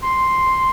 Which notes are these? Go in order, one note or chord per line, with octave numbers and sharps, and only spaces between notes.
C6